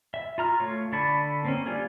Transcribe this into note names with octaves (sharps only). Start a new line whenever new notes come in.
E5
F4 A#5 F6
A3 F4 C#5
D3 D4 A5 B5 C#6
A#3 C4 C#4
G3 D4 F4 G#4